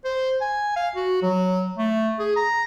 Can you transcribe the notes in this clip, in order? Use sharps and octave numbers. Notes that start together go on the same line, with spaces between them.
C5
G#5
F5
F#4
F#3
A3
G#4
A#5